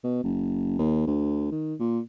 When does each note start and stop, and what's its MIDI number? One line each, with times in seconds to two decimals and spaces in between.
0.04 0.22 47
0.23 0.76 30
0.79 1.05 39
1.07 1.47 38
1.51 1.75 51
1.79 2.00 46